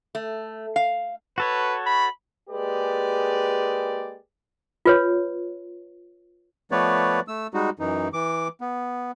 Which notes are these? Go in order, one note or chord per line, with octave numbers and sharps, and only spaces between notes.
A3
F5
F#4 A4 B4 C#5
B5
G#3 A#3 G4 G#4 B4 D5
F4 B4 C#5
F3 A3 B3 B4 C#5 D5
A3 E6
G3 G#3 D#4 F#4
F#2 E3 D#4
E3 D6
B3